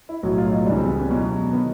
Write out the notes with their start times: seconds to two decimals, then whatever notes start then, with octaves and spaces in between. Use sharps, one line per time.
0.09 E4
0.23 B1 A2 F#3 F#4
0.38 F4
0.51 D#4
0.66 C#2 C#3 E3 G3 D4
0.77 C4
0.88 B3
0.98 C#4
1.10 E2 B2 F#3
1.52 D#3 B3